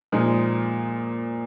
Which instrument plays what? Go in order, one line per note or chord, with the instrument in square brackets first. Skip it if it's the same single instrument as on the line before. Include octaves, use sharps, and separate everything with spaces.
[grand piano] A#2 F3 G#3 D#4